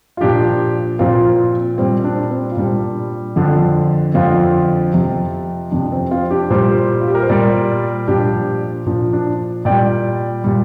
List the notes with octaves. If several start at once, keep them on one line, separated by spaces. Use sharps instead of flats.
F4
A#2 F3 D4 G4
A#2 F3 C4 F4
A#2 G3 C4
D4
C4
F4
A#2 G3 D4
F2 D3 F3 D4
F2 D3 F3 C4 F4
F2 C3 F3
F2 C3 F3 D4
C4
C4 F4
D4 G4
A#2 G3 G4 C5
F4
G4
A#4
C5
A#2 G3 A#4 D5
A#2 F3 D4 G4
A#2 F3 D4
D4
A#2 G3 D5 G5
A#2 G3